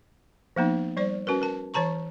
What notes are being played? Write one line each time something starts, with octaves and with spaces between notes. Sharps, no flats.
F3 A#3 B3 D#4
G3 C5 D5
C#4 F#4 A#4 B4
A#4 A5
E3 C#5 A5 A#5 C#6